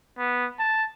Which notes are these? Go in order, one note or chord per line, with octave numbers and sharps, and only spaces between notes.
B3
A5